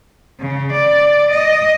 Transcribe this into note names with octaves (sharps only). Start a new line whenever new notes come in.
C#3
D5
D#5